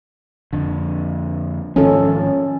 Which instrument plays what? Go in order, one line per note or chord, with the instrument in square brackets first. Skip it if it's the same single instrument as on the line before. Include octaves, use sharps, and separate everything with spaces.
[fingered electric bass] F2 D3
[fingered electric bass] G#2 D#3 F3 [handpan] C#4 A4